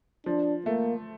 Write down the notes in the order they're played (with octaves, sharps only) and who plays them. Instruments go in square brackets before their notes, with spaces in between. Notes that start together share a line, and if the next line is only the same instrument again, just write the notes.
[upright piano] F3 [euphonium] D4
[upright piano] A3 [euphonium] A#3